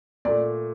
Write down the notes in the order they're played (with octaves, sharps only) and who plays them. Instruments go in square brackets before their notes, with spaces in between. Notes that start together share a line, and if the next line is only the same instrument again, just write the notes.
[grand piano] A#2 A3 D5